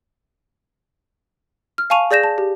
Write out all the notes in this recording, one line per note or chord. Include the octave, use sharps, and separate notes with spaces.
F6
F5 G#5 A5 C#6 D#7 F7
G#4 D5 G6 A#6 E7
A5
G4